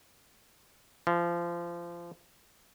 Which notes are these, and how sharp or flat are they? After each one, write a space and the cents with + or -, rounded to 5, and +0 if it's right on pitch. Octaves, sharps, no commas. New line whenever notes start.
F3 -25